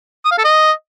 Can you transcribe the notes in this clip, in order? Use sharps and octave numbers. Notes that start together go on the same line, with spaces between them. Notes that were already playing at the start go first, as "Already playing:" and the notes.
D#6
F5
A4
D#5